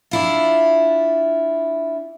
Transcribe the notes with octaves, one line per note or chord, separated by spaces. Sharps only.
D4 E4 F4